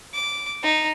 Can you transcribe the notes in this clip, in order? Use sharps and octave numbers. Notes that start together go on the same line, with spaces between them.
D6
D#4